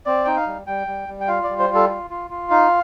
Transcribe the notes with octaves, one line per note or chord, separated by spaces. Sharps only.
C4 D5
D#4 G5
F5
G3
G3 G5
G3
G3
G5
F4 F5
D5
G3
C5
F4
A4
F4
F4
F4
D#4 F5